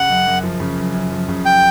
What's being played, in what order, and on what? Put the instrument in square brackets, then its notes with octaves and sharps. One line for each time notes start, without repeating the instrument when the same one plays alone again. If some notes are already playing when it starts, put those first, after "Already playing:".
Already playing: [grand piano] C#3 [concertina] F#5
[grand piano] F#2
F#2
F3
C#3
F#2
F#2
F3
C#3
[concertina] G5